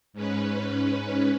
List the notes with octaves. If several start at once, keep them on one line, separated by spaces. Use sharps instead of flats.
G#2 C#4 B4